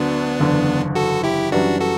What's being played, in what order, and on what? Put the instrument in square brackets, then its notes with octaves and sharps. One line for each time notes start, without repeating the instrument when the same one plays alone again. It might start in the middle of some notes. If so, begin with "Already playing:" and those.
Already playing: [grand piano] D2 D3 F#3 [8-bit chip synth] B3 D4
[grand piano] F#1 E2 D3
[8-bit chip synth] F#4 A4
E4 G4
[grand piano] F#2 E3 G3 [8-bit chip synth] D4 F#4
[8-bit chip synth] F#4 A4